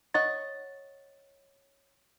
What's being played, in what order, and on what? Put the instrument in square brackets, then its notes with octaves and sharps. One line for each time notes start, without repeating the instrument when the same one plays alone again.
[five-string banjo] C#5 D#5 F#5 [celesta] A6